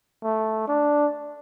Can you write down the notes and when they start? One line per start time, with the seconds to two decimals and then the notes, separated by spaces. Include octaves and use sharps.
0.24 A3
0.68 D4